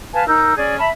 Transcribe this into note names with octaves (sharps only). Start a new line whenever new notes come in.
B4 F5 G#5 A5
D#4 A#4 E6 G6
C#4 G#4 D5
E5 A5 B5